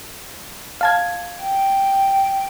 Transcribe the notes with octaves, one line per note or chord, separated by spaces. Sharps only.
F5 A5 G#6
G5